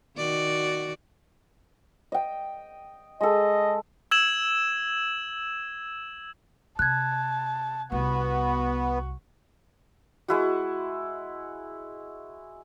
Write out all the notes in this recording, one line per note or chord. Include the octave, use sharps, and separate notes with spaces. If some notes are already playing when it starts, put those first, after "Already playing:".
D#3 F#4 D5
D#5 G5
G#3 A4 D#5
E6 G#6 E7 F#7
C3 A5 F#6 G#6
C2 B3 F#4
G#3 E4 F#4